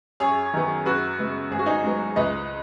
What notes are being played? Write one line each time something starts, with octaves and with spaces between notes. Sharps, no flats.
F#2 G#4 C#5
D#3 F#3 B3
F#2 F#4 B4
C#3 G#3 B3
G#1 G#4
F#4
D#4 G#4
G#2 F#3 B3
C#2 B4 D#5